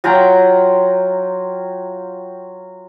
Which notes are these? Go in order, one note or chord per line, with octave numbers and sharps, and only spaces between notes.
F#3 F4 G5 A#5